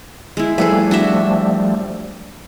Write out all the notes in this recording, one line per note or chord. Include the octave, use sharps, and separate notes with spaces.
G#3 E4
F3 G3 A3 G#4 A4 B4
D4 F#4 E5